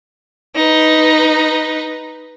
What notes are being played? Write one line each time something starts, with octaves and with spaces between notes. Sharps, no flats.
D#4 B4